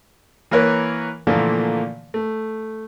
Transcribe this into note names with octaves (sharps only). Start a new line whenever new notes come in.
E3 A#3 A#4 B4 C#5
A#2 D3 E3 F3 A3 A#3
A3